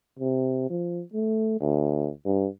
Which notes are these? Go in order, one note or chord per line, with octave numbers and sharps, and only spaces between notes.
C3
F3
A3
D2
G2